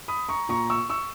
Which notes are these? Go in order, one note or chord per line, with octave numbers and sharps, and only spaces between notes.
B5 D#6
A#5 C#6
A#2 A#5 C#6
C#6 E6
C#6 E6